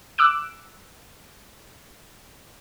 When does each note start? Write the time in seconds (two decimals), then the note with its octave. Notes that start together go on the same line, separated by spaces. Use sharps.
0.18 D6 E6 F#6 D7